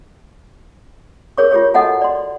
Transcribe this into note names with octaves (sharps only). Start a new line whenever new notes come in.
G#4 A#4 C#5 C#6
F4 G4 G#4 C#5
F#4 A4 D#5 F#5 G#5 A5
D5 C6